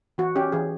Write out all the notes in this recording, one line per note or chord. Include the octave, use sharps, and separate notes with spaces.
E3 F#4
C#4 G4
E3 G#4